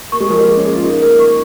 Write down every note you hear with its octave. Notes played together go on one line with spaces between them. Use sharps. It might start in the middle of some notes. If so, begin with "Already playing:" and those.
A#3 C#6
G#3
F3 A#4
G#3
A#3 G#4
C#4
A#3 G#4
F4
D#4 A#4
A#3 A#4
C#6